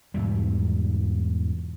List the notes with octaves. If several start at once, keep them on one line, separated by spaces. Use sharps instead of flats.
E2 G#2 B2 G3